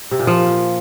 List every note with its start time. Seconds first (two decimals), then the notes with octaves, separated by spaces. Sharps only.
0.11 C3
0.19 A#2
0.27 F3